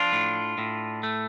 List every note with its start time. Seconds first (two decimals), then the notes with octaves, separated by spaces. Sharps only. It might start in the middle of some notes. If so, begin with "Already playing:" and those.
Already playing: F3 D4 F4
0.13 A2
0.58 A2
1.03 A3